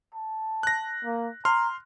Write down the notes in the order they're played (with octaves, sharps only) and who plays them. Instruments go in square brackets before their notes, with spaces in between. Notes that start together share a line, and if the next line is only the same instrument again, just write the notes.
[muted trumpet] A5
[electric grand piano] F#6 A#6
[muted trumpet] A#3
[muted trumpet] A#5 [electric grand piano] C6 F6